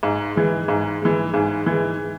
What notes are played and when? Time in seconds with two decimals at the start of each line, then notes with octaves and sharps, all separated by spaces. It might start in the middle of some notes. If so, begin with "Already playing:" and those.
0.03 G#2
0.36 E3 G#3
0.68 G#2
1.02 E3 G#3
1.34 G#2
1.66 E3 G#3